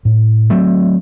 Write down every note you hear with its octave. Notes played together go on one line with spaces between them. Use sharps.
A2
F#3 A3 C4